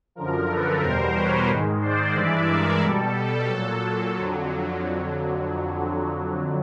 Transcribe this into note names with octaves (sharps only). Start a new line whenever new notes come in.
F#2 D3 F3 A#4
A4 B4
E2 B2 G3 A#4 C5
B4 C#5
G#2 D#3 G#3
C5 D5
G2 E3 G#3 D5 E5
A#4
B2 G3 A4
A#2 F#3
F2 D3 F#3